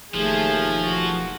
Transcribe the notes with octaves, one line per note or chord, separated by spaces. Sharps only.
E1 D#2 F3 A3 G#4
F#4